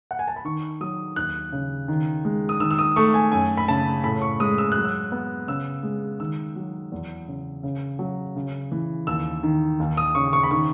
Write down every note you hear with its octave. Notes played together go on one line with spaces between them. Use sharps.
F#5
G#5
A5
B5
D#3 C#6
F#3 D#6
D#2 F#6
C#3
D#3
G#3
D#6
D#3 E6
E6
D#6
A3 C#6
G#5
F#2 G#5
B5
C#3 A5
A2 B5
C#6
G#3 D#6
E6
F#3 F#6
E6
B3
C#3 E6
G#3
D#3 E6
F#3
E2
C#3
C#3
F#3
C#3
E3
D#2 E6
D#3
D#2
D#6
C#3 C#6
C#6
B5
D#3 C#6